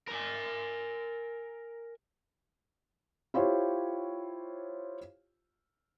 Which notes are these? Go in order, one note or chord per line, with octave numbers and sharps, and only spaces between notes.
A#4 G#5
E4 F4 G4 C5 C#5